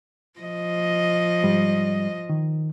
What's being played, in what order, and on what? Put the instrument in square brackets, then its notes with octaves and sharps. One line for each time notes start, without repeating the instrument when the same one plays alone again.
[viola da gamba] F3 D#5
[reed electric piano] G#2 G3
D#3